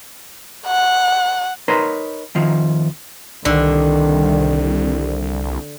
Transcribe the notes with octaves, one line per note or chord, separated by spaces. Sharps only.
F#5
D#4 A#4 B4 C#5 A#5 C6
F2 D#3 F3
C2 D3 D#3